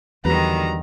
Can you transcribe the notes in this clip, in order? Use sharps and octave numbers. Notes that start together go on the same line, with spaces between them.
E2 D3 D#3 F#3 G3 B4 A#5